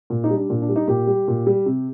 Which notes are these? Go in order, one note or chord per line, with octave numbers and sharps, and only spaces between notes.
A#2
D#4
G3
D4
A#2 D4
D4
G3
D#4
A#2 G4
G3
A#2
G3
C3